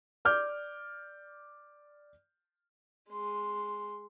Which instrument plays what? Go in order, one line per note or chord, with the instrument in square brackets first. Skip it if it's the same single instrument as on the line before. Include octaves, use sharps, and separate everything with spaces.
[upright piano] D5 D6 F6 G6
[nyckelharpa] G#3 C6